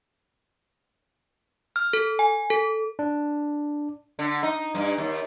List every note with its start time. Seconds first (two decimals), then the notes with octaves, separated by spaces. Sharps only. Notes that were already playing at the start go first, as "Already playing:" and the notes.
1.76 F6
1.93 A4
2.19 G#5
2.50 A4
2.99 D4
4.19 D3
4.43 D#4
4.75 G2
4.98 D#2